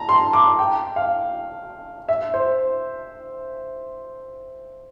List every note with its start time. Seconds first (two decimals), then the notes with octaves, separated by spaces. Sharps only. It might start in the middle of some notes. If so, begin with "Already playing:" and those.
Already playing: A5 A#5
0.09 C6
0.33 D6
0.59 G5
0.96 F5
2.08 E5
2.34 C5